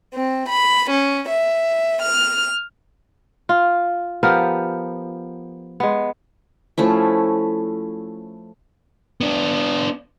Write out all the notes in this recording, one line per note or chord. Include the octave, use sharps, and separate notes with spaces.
C4
B5
C#4
E5
F6
F4
F3 B3 G4 A#4
G#3 B3
F3 A3 C#4 E4
B3 D4